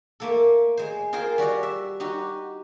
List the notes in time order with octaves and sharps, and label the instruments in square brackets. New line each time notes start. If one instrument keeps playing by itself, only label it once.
[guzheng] A3 A#3 A4
G#3 C5
F4 G#4 A#4 C5 G5
G3 F#4 D5 D#5
E5
D#4 F#4 G4